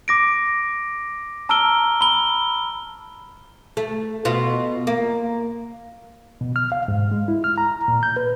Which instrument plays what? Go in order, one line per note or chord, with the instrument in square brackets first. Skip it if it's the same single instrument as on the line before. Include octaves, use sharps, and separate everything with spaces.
[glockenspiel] D6 A#6 D7
A5 A#5 E6 F6 D7 G7
B5 G7
[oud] A3
B2 F4
A#3
[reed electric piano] B2
F6
F5
G#2
G#3
E4
F6
A#5
A#2
G6
B4